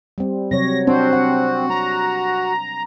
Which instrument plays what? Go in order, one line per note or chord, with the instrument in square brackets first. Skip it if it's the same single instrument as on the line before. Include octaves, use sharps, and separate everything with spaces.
[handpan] G3 C4
[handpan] C3 F#3 C#5 [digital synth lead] A#6
[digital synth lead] C4 [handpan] D4 C5 [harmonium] F#4
[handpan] F#5
[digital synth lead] A#5